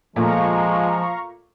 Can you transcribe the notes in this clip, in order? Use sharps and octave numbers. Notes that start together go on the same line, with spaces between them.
A#2 F3 G#3 A3 F5 A#5 C#6